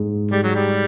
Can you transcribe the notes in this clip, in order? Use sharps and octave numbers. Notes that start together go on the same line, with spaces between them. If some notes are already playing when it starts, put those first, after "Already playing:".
Already playing: G#2 G#3
G3 G#3
F#3
G3